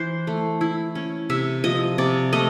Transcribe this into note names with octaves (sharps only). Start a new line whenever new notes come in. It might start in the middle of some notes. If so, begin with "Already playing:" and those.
Already playing: E3 C5
A3
E4
C#4
C3 E5
F3 D#5
C3 D5
A3 D#5